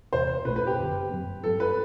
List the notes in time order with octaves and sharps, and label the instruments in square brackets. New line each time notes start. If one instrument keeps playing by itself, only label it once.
[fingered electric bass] E1 E2 C3 [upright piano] C5
[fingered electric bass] B1 B2 A3 [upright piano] B4
[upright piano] B4
G4
[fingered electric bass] F#1 F#2 D3
F#2 F#3 C4
[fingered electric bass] G2 F#3 C4 [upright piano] A4
[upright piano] B4